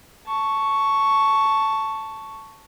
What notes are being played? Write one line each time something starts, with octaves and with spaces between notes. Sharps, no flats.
A5 C#6